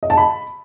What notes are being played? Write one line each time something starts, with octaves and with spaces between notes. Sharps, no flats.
D#5
A5
B5